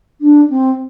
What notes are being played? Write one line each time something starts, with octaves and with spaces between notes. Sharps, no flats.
D4
C4